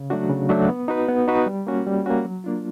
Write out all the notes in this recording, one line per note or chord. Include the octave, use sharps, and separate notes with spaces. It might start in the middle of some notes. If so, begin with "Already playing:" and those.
Already playing: C#3
F#3 A3 D4 F#4
C#3
F#3 A3 D4 F#4
B3
D#4 F#4 B4
B3
D#4 F#4 B4
G3
A#3 C#4 F#4
G3
A#3 C#4 F#4
F#3
A#3 D4 F4